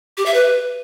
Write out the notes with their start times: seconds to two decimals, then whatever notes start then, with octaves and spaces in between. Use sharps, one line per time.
0.17 G4
0.26 E5
0.34 B4